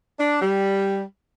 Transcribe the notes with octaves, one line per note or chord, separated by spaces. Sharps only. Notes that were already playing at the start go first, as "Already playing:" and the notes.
D4
G3